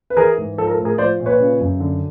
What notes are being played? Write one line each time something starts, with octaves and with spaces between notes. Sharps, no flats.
B4
E3 G#4 A#4
G#2
F3 A4
A#4
A4
A2
G#4 A#4
F3 C5 D5
A#2
B4 C#5
C#3
F#2
D3